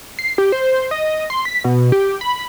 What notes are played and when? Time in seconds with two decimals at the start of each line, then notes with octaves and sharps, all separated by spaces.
0.19 C7
0.38 G4
0.52 C5
0.91 D#5
1.30 C6
1.45 B6
1.64 B2
1.92 G4
2.21 B5